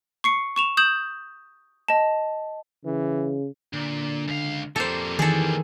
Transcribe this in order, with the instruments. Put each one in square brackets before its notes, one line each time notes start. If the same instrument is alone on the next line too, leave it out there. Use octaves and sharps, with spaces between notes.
[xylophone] C#6 C7 C#7
C#6 E7 F7
D#6 G6 E7 F#7
D#5 A5
[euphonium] C#3 [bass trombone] E3
[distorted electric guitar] A#2 [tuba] D3
[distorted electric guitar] C#2 F5
[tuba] F2 [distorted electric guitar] G3 A#3 [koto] A4 C5
[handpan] D#3 E3 [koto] G#4 A4